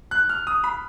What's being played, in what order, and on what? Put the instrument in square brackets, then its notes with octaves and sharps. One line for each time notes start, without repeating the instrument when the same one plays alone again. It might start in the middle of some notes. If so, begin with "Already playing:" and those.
[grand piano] F#6
F6
D#6
B5